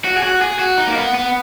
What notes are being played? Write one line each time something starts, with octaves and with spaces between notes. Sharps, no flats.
F#4
G#4
F#4
G#4
F#4
D#4
A#3
B3
B3